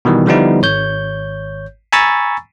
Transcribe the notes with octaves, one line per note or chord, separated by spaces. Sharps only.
B2 D#3 E3 G3
D3 F3 G3 B3 D#4 E4
G#1 C#5 G6
G#5 A#5 B5 C#6 E6 A6